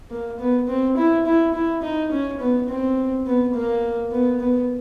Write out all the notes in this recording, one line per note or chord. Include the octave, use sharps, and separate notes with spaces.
A#3
B3
C4
E4
E4
E4
D#4
C#4
B3
C4
B3
A#3
B3
B3